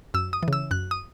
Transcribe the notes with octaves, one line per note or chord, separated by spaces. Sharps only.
F#2 E6
D#6
E3
C#3 E6
F#2 F#6
D#6